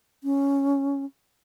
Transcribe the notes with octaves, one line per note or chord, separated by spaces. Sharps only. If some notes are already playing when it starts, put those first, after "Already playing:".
C#4